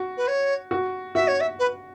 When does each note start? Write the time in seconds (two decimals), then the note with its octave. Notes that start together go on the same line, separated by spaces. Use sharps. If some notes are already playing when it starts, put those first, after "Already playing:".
Already playing: F#4
0.17 B4
0.27 C#5
0.71 F#4
1.15 F#4 E5
1.27 C#5
1.40 E5
1.59 B4